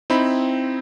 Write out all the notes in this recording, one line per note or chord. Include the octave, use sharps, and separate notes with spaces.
C4 D#4 E4 B5